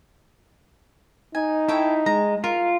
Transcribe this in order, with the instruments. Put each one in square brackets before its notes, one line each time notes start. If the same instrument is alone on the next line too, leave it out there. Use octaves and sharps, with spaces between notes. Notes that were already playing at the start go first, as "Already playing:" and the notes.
[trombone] D#4 [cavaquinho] G#5
[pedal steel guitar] E4 [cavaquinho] A4 C#5 G5
[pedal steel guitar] G#3 [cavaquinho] A#5
[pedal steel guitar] F4 [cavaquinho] A#4